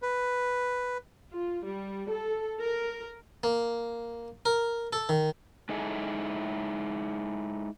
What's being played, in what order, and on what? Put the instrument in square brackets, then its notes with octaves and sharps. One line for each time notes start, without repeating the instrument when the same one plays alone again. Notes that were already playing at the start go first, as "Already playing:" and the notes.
[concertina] B4
[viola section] F4
G3
A4
A#4
[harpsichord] A#3
A#4
A4
D#3
[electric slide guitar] G#3 D#4 E4 G#4 A4